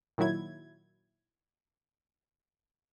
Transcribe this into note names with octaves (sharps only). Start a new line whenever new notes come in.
A#2 D#3 F#3 E4 G#6